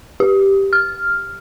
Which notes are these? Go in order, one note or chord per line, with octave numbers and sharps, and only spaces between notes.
G4
F6